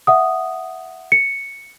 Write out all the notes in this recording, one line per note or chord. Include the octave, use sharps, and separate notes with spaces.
E5 F#5 D#6
C#7